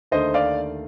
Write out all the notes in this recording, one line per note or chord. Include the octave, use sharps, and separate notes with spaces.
D#2 D3 A3 C5 D#5
D5 F5